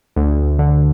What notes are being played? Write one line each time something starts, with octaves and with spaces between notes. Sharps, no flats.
D2
D3